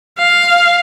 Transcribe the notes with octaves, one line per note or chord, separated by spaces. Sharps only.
F5